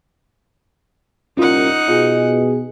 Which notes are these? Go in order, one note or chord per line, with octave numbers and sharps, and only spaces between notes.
C2 A#2 C#4 D#4 F4 F#5
B2 F4 G#4 D#5